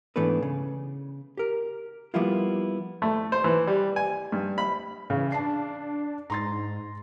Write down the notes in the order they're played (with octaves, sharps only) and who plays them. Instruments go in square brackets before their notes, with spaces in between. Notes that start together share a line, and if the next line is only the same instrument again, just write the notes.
[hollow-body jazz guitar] G#2 E3 A3 B3 D4 B4
C#3
G4 A#4
F3 G3 A#3 B3 E4 F4
[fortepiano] A3
C5
E3
G3
G#5
G2
B5
[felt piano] C#3 [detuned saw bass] E3
[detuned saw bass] D4 [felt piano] A5 C7
[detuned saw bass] G#2 [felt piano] A#5 C6 A6